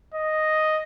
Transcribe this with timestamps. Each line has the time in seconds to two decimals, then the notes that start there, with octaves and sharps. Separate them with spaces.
0.14 D#5